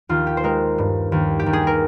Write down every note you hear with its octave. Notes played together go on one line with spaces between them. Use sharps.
D#2 F4
G4
C5
G#3 A#4
G2
D#2
G4
D#2
G#4
A#4